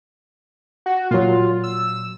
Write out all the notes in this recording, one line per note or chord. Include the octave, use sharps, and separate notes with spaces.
F#4
A#2 F#3 F4
E6